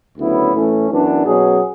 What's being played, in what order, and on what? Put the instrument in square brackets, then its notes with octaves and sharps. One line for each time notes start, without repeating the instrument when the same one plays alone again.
[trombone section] D2 C#3 F#3 B3 E4
A2 E3 A3 C#4
F#2 E3 B3 D4
B2 F#3 C#4 G#4